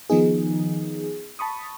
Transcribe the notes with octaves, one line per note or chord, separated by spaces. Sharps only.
D#3 F3 B3 D#4 G#4
A5 B5 C#6 D#6